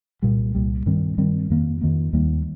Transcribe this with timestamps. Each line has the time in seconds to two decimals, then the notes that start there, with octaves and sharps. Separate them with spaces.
0.22 C2 A#2 G3
0.55 C2 A#2 G3
0.86 G2 D#3 G3 C4
1.18 G2 D#3 G3 C4
1.50 F2 D#3 A#3
1.81 F2 D#3 A#3
2.13 D#2 D#3 G3 A#3